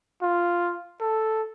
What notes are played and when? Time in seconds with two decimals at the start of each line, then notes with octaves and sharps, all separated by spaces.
0.22 F4
1.01 A4